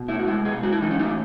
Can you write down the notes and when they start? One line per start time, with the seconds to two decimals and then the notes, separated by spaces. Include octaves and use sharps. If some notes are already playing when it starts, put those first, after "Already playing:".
Already playing: B2
0.08 A3 E4
0.19 F#4
0.27 G#3 E4
0.45 B2 G#4
0.63 G#3 F#4
0.72 E4
0.81 E3 D#4
0.91 C#4
0.99 A3 D#4